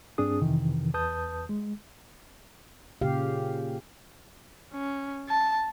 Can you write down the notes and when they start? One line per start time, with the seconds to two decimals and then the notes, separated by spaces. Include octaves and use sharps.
0.18 G2 C4 D4 G#4 D#6
0.41 F2 C3 D#3 E3
0.94 E2 B4 A5 D#6 G6
1.49 G#3
3.01 A#2 C#3 G4 F5
4.73 C#4
5.29 A5